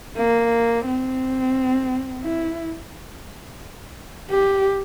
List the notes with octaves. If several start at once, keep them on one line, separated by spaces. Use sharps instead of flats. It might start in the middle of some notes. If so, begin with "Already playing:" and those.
A#3
C4
E4
G4